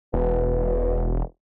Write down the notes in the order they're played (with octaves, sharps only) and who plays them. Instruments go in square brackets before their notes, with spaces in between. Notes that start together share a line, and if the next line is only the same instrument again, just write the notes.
[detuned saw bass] E1 [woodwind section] B2